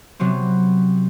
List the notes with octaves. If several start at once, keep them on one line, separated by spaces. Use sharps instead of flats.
C3 F#3 B3 C4